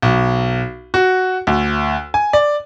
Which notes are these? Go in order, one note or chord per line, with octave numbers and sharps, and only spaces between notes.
B1
F#4
D2
G#5
D5